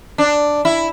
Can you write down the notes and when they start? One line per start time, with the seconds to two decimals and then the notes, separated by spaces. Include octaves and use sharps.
0.18 D4
0.65 E4